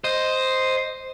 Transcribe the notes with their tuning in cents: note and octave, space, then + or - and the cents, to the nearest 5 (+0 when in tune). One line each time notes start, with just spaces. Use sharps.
C5 +0 D#5 +0